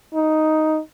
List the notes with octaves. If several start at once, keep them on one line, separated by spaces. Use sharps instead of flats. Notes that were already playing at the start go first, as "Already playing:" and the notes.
D#4